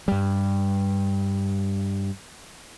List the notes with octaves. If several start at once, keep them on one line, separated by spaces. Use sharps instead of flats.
G2 G3